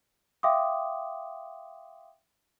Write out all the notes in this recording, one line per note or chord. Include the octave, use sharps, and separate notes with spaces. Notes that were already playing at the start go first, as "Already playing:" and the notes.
E5 F5 G5 C6 D6 D#6